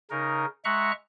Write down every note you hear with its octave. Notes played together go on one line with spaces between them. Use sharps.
C#3 D#4 A#4
G#3 E5 F#5 A#5 C#6 F#6